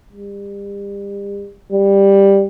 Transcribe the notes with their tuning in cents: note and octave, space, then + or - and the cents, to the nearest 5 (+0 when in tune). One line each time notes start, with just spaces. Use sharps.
G3 +35
G3 +10